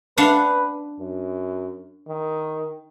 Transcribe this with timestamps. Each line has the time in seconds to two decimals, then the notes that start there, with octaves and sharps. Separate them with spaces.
0.17 D4 B4 F5 F#5
0.99 F#2
2.08 D#3